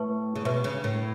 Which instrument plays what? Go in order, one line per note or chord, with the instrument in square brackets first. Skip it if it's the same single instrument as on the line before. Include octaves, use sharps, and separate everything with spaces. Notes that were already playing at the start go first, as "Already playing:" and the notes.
Already playing: [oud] A2 [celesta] B4 A5 C#6
[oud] C#3
[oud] B2 [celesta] B4 E5 C#6
[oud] C#3
A2